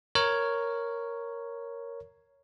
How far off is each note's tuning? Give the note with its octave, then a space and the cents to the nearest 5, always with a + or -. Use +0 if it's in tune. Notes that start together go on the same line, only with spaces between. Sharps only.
A#4 +0 C#5 +0